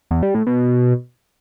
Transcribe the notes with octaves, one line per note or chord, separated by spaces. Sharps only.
E2
G3
A2
B2